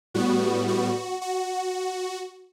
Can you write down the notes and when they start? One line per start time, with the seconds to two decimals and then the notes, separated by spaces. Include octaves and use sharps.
0.14 A2 G3 B3 F#4
0.68 F#4
1.22 F#4